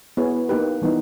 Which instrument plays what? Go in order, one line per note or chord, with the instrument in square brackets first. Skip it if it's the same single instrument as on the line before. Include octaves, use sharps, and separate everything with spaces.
[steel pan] B3 E4 G#4 C#5
A#3 D#4 G4 B4
E3 G3 B3 D#4